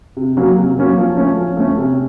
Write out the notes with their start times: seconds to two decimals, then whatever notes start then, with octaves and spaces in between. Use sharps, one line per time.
0.17 C3
0.37 F#3 A#3 C#4
0.57 C3
0.77 F#3 A#3 C#4
0.97 F3
1.17 A3 C#4
1.37 F3
1.57 A3 C#4
1.78 C3